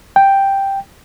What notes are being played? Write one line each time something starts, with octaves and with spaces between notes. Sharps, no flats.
G5